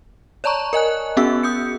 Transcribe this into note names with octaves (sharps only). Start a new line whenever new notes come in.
C#5 D5 A5 A#5 C#6
A#4 D#5 G#5 F#6
B3 C#4 F#4 G#4 E6
D#6 G6 C#7